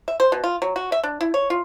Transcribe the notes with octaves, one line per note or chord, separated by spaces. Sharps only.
E5
C5
B2
F4
F#3
F#4
E5
D4
E4
C#5
F4